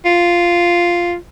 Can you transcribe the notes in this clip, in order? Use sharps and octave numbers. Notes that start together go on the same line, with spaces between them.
F4